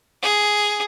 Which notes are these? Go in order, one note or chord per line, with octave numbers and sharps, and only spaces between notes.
G#4